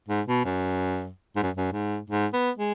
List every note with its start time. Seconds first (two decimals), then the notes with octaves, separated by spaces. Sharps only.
0.08 G#2
0.28 B2
0.45 F#2
1.36 G#2
1.43 F#2
1.57 F#2
1.72 G#2
2.10 G#2
2.33 B3
2.58 G#3